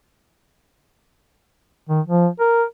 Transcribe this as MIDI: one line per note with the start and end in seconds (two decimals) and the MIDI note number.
1.89 2.00 51
2.07 2.27 53
2.40 2.64 70